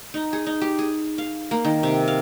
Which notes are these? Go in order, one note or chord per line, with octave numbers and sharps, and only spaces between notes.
D#4
G#4
D#4
G4
G#4
F5
A#3
D#3
C3
F5